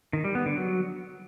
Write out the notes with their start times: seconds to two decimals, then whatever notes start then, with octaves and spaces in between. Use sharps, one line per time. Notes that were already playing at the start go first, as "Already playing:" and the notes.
0.13 D#3
0.24 G3
0.35 B3
0.46 D3
0.57 F#3